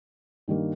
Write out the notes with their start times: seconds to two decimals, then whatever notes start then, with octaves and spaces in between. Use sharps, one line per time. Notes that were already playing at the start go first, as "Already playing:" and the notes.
0.48 G2 D#3 G3 A#3